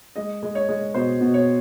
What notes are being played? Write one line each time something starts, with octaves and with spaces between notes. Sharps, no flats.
G#3 D#5
G#3
C#5
G#3
B2 C5
B2
C#5